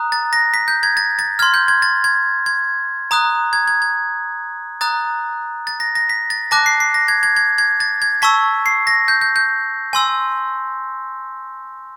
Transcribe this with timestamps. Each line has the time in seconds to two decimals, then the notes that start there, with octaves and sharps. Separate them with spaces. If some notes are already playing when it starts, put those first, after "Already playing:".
Already playing: A#5 D#6 F#6
0.12 A6
0.33 A#6
0.54 B6
0.68 G6
0.83 G#6
0.97 A6
1.19 A6
1.39 C6 F6 G#6
1.54 G6
1.68 G#6
1.82 A6
2.04 G#6
2.46 G#6
3.11 A#5 D#6 F#6
3.53 G#6
3.68 G#6
3.82 G#6
4.81 A#5 D#6 F#6 A6
5.67 A6
5.80 A#6
5.95 A#6
6.09 B6
6.30 A6
6.51 A5 D6 F#6 A#6
6.66 C7
6.80 C7
6.94 A#6
7.08 G#6
7.23 G#6
7.36 G#6
7.58 G#6
7.80 A6
8.02 G#6
8.22 A5 C#6 E6 B6
8.66 C7
8.87 A#6
9.08 G6
9.21 G6
9.36 G6
9.93 G#5 C6 E6